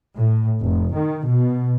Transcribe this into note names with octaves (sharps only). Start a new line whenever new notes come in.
A2
F1
D#3
B2